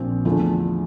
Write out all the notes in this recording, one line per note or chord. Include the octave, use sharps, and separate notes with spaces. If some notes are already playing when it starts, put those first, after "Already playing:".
Already playing: A#1 A#2 F3 C4
E2 D3 F3 A3